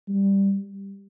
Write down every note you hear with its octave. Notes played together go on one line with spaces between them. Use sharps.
G3